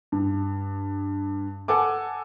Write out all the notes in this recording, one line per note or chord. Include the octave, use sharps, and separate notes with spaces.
G2
A4 F#5 G#5 D6